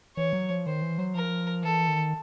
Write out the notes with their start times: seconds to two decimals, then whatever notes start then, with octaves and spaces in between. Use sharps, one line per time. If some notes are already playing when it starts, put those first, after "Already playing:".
0.16 E3 C#5
0.33 F#3
0.50 F3
0.66 D#3 C5
0.82 E3
0.98 F#3
1.15 F3 A#4
1.63 E3 A4
1.88 D#3